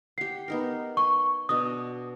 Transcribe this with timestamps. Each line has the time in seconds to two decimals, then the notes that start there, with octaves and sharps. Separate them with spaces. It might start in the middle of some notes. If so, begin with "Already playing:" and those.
0.18 G4 F#5 C7
0.48 B3 D#4 A#4
0.97 G#5 C#6
1.49 B2 D4 D#5 D#6